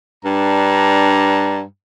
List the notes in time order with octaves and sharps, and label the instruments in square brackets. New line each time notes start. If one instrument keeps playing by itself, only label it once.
[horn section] G2 D4 A#5